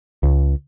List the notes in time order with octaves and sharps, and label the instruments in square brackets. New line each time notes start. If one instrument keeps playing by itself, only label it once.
[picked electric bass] C#2